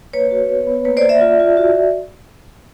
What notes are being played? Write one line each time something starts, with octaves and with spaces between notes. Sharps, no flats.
A#3 B4 C#5
F#4
B3
B3
A#3 B4 C#5
C5 D5
A#3
D5 E5
F4
F4
F#4